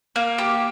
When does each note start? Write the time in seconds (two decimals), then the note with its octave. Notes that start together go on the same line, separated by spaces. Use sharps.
0.16 A#3
0.38 G4